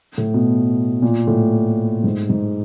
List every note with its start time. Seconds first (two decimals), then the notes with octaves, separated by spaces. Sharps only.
0.18 A2
0.34 B2
1.02 A#2
1.27 A2
2.04 G#2
2.29 G#2